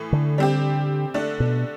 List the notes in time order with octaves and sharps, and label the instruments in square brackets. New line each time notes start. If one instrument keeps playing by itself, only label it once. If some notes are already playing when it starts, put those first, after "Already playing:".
Already playing: [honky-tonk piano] A2 E3
[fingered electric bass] D3
[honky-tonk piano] G3 C4 G4
D3 A3 D4
[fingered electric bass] B2